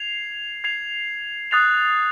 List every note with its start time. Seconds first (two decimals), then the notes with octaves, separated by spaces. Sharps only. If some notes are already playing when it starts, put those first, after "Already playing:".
Already playing: G#6 C7 F7
0.64 G#6 C7 F7
1.51 D#6 F#6 A6 C7 F7